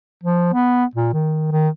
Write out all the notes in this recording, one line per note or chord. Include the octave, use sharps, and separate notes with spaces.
F3
B3
A#2
D#3
D#3